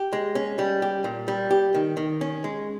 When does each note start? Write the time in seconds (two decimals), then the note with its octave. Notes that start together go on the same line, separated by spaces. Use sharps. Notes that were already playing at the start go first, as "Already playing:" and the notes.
Already playing: G4
0.13 G#3
0.35 C#4
0.59 G3
0.82 G4
1.04 A#2
1.28 G3
1.51 G4
1.74 D#3
1.97 D#3
2.21 C#4
2.44 G#3